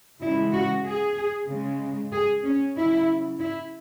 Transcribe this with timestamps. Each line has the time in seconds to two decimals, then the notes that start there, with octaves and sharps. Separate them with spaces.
0.21 C#3 E3 G#3 E4
0.52 F#4
0.85 G#4
1.48 C#3 G#3
2.12 G#4
2.44 C#4
2.76 C#3 F#3 E4
3.39 E4